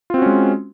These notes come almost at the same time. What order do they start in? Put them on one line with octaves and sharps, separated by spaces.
F4 C4 F#4 C#4 G#3